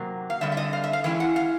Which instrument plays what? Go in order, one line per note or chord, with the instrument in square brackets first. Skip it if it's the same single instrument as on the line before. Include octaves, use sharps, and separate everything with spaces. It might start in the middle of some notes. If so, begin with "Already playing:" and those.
Already playing: [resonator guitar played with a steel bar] C3 D#3 F#3 A#3
F5
D3 G3 C4 E5
E5
D#5
F5
E5
F5
E3 G#3 C#4 E4 G5
F#5
F5